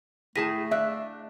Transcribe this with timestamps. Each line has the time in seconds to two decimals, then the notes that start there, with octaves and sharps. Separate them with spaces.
0.36 A2 A3 G#4 A5 A#6 B6 D#7
0.71 D4 E5 F5 E6 F#6